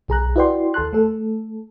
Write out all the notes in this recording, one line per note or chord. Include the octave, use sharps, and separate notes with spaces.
B1 G#4 A#5 F#6
E4 F#4 B4 D5 G5 C6
D#2 A4 A5 C6 F#6
A3 A4